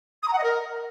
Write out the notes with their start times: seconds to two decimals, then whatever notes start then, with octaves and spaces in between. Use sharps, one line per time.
0.22 D#6
0.28 A#5
0.33 F#5
0.38 D#5
0.43 A#4